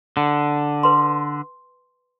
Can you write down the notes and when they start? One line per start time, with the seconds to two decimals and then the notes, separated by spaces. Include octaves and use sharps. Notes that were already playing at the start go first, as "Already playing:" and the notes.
0.17 D3
0.83 B4 C6